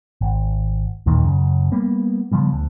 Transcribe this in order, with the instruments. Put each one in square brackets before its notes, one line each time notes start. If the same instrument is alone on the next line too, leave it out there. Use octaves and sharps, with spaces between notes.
[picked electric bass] G#1
A1 D#2 A#2 D#3
F#2 C#3
G3 A#3 B3
C#3 F3 G3 B3
D2